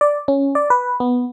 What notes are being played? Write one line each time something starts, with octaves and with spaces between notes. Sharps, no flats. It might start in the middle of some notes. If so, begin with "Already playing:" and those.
D5
C#4
D5
B4
B3